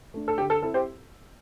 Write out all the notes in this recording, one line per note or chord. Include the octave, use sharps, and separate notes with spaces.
A3 D4
A4
D3 G4
A4
C4 E4 A4
G4 C5